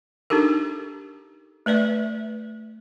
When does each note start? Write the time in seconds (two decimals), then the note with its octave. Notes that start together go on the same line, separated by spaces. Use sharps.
0.30 D4 D#4 G4 A4 A#4
1.66 A3 B4 D5 E5